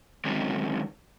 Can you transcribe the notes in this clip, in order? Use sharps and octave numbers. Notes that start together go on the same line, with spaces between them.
D3 D#3 F#3 G#3 C4 C#4